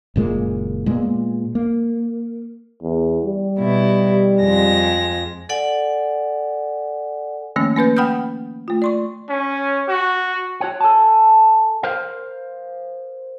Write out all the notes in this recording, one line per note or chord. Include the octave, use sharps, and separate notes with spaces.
F#1 A#2 G#3 A#3
A#2 G#3 B3
A#3
E2
G3
B2 E4
F2 G#3 A#6
A4 D5 F#5 G#5
D#3 F3 A3 A#3 C#4
A#3 C#4 B4 G6
F#5 G5 B5 D#6 F6 G6
A3 F4
D5 C6 C#6
C#4
F#4
F#4 C#5 F#5
A4 G#5 A5
A#4 C5 F5